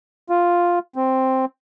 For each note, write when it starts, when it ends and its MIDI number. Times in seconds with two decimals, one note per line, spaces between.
0.30 0.79 65
0.96 1.45 60